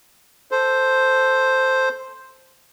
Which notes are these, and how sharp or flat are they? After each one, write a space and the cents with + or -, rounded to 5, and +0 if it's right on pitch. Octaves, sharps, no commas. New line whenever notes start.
A4 +0 C5 +0